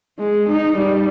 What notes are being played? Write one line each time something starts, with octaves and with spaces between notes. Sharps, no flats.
G#3
D#4
G3